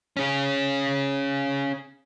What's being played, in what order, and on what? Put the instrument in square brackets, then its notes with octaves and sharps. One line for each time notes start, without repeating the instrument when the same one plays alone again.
[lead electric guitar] C#4 G#4